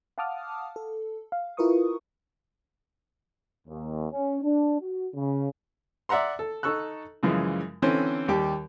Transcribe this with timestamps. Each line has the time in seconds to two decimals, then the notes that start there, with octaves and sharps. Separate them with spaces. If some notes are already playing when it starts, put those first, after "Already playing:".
0.18 F5 F#5 A5 D6 D#6 F6
0.76 A4
1.32 F5
1.57 E4 F4 A#4 B4 C#6 D#6
3.68 D#2
4.12 C#4
4.43 D4
4.80 F#4
5.14 C#3
6.09 D5 E5 F#5 A#5 C6
6.39 A4
6.63 D#4 A4 C#6 E6 F#6
7.23 F#2 C#3 E3 F3 G#3
7.82 D3 E3 C4 C#4 A4 C5
8.28 D#2 G3 G4 D6